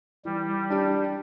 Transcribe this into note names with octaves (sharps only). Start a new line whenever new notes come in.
E3 G3
D4 G4